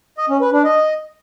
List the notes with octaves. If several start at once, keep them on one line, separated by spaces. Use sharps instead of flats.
D#5
C#4
B4
D4
D#5